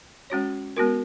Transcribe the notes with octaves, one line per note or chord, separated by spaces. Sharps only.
G#3 C#4 F#4 C#5
G#3 B3 F#4 A#4